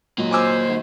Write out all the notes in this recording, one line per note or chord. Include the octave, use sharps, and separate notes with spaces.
A#2 F#3 A#3 D#5
C5 G#5 D6 E6
G#1